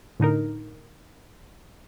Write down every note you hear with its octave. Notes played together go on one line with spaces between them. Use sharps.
A2 D3 D#4 A#4